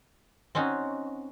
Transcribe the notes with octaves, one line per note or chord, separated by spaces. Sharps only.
C4 C#4 D#4 F#4